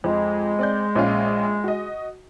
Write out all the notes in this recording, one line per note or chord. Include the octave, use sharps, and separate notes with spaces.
F2 G#3
C4 D5 G6
A#1 C#4 F4
F#4 D#5